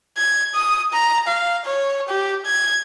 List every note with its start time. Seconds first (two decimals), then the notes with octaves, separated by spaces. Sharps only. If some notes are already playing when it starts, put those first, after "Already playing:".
0.17 G#6
0.55 D#6
0.93 A#5
1.28 F5
1.65 C#5
2.09 G4
2.46 G#6